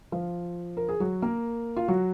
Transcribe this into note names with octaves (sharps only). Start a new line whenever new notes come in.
F3 F4
A#4
G#4
F#3 F#4
A#3 A#4
F4
F#3 F#4